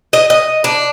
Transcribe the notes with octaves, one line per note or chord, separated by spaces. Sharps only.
D#5
D#5
D4